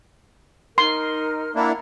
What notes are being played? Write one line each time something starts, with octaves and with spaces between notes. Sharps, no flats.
D#4 A#4 C6 F6
A#3 D4 E4 F#5 A#5